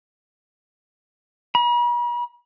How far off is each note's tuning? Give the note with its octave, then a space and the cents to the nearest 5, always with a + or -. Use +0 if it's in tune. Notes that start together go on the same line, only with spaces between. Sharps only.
B5 -45